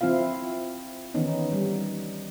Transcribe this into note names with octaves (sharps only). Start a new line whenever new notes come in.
F3 C4 E4 F4 F5
D#3 E3 B3 C#4 D#4
G3